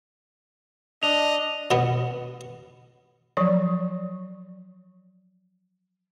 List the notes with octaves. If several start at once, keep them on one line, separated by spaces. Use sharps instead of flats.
D4 D#5 F7
B2 B3
F3 F#3 C#5 D5